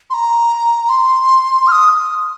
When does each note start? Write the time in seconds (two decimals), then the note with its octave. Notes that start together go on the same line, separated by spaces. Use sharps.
0.10 C6
0.14 A#5
0.89 C6
1.67 F6
1.72 D#6